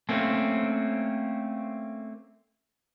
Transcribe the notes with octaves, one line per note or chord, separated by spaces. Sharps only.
A3 A#3 C4 C#4